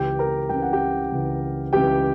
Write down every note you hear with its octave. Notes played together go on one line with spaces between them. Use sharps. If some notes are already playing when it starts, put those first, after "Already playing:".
Already playing: C#2 C#3 E3 G4 G5
A#4 A#5
C#2 C#3 E3 G5
F#5
G4 G5
C#2 C#3 E3
C#2 C#3 E3 G4 G5